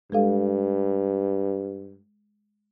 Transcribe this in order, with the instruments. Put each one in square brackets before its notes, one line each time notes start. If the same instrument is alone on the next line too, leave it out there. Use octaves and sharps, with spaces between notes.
[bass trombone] G2 [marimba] G#3 A4 F5